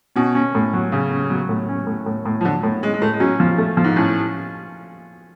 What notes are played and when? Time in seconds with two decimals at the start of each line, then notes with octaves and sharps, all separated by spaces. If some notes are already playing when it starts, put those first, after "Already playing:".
0.16 B2 C#4
0.35 C#4
0.55 A2
0.73 F#3
0.92 C#3 C#4
1.11 C#4
1.30 F#3
1.49 A2
1.69 C#4
1.87 A2
2.06 A2
2.25 A2
2.41 F3
2.44 D3 F#3
2.63 A2
2.83 G#3 C#4
2.94 G#3
3.02 A2 A3
3.13 G#3
3.20 F#3 C#4
3.40 F3
3.58 A3
3.77 F3
3.84 G#2
3.96 A2 C#4